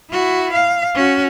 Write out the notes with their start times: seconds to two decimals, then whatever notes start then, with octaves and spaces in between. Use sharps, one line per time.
0.11 E4 F#4
0.53 F5
0.95 C#4 F#4